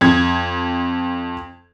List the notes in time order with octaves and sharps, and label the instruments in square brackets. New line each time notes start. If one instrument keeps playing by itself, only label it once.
[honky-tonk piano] F2 G#6